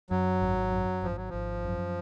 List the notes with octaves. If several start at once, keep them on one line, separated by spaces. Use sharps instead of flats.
F#2 F#3
G#1
F#2
G#1 F3
F#3
G#1 F3
F#2